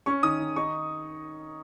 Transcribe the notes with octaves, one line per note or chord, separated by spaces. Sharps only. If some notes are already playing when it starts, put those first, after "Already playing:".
C#4 C#6
D#3 D#6
D#3
D#4 C#6